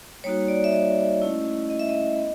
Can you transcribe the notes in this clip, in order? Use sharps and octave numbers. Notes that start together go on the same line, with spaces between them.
G3 A#3 D#4 F#4 C#5
D5
E5
D#5
A3 C#4 E4
D#5
E5
D#5
B3